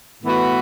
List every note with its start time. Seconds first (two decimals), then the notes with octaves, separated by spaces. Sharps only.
0.22 A2 E3 B3 F#4